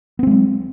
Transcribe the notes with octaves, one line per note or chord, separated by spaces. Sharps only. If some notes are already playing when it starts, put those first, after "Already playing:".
F#3 G#3 B3 C4